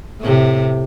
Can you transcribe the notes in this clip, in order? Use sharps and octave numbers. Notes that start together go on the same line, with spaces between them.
A2 C3